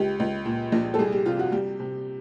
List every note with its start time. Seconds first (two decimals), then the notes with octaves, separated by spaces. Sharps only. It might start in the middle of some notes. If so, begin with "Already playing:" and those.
Already playing: C#2 G4
0.20 C#2
0.45 A#2
0.72 A#1
0.94 A4
0.99 C2 G#4
1.12 G4
1.26 C3 F4
1.39 F#4
1.52 G3 G4
1.80 C3